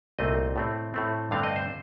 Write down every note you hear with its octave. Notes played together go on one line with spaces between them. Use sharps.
C2 A#2 A3 C4 D#5
A2 A3 C4
A2 A3 C4
G2 D3 A3 C4 F5
D#5
C5